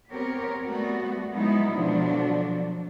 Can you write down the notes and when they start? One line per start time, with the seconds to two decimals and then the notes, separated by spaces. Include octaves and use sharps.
0.10 B3 C4 G4 A#4 C#5
0.66 G3 A3 B3 F#4
1.32 F3 F#3 G#3 B3 D#4 E4
1.75 B2 D3 F3 F#3 D4